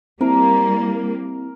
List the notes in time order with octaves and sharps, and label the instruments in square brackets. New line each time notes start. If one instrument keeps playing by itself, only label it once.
[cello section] G3 A#3 [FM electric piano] C4 E4 [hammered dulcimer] A#4